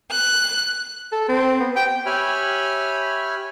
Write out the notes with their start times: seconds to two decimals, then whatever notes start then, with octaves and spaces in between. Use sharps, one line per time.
0.12 F#6
1.12 A4
1.29 C4
1.60 B3
1.76 G5
2.06 G4 C#5 E5 G#5 B5 F6